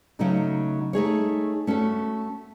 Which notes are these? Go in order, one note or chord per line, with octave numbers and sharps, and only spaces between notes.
C#3 F#3 A3 D#4
A3 D#4 G#4 C#5
A3 C#4 F#4 A4